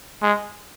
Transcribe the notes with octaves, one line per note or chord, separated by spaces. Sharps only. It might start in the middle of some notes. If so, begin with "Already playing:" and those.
G#3